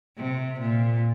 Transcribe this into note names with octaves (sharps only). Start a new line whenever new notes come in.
C3
A#2